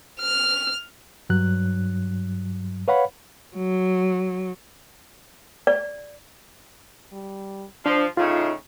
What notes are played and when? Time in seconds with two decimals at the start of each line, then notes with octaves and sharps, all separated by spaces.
0.21 F6
1.30 G2 F#3 F#6
2.88 B4 C#5 F5 F#5 B5
3.55 F#3
5.67 D5
7.12 G3
7.86 F3 D4 C5
8.17 A2 C#3 D#4 F4